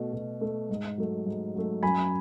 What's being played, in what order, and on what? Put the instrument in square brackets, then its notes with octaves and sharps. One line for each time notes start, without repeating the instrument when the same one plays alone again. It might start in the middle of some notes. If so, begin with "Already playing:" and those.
Already playing: [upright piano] B2 A3
B2
A3
G#2
F#3 A3
G#2
F#3 A3
F#2 G#5 B5